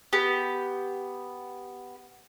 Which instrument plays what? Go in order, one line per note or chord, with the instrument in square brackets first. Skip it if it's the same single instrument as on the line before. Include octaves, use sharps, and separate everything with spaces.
[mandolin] B3 G4